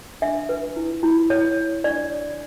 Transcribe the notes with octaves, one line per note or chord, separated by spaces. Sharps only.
D4 E5
B4
E4
E4
E4 C#5
C#5
D4 D5
C#5